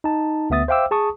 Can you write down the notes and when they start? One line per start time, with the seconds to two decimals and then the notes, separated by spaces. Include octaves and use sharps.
0.04 D#4 A5
0.50 D2 B3 E5 D#6 A6
0.68 C5 E5 F5 G5 D6 E6
0.91 G#4 A5 C#6 D#6